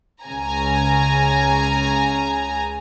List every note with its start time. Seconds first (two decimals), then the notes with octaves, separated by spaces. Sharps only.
0.24 C#2 C#3 G#5 A#5